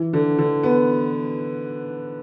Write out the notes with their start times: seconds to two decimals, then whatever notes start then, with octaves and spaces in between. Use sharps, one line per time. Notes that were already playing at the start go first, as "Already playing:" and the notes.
Already playing: E3
0.13 D3
0.38 D3
0.63 B3